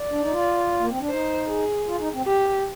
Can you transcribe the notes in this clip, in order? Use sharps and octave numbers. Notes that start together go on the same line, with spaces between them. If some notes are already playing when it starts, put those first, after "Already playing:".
Already playing: D5
D4
D#4
F4
A#3
C4
D4
D#4 C5
G#4
F4
D#4
C4
G4